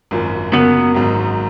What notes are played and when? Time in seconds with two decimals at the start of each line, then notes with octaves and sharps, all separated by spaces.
0.11 G#1 F#2 F3
0.52 F#2 C#3 F#3 A#3 B3
0.95 G#1 G#2 F#3